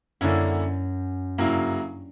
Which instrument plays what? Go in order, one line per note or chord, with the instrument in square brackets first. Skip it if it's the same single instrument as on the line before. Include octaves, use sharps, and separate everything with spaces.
[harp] F#2 [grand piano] D3 A#3 C#4 E4
[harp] G2 [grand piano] C#3 F#3 A#3 E4